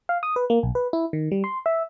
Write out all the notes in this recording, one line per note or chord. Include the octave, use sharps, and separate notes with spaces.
F5
D#6
B4
A#3
B1
B4
E4
D#3
G3
C6
E5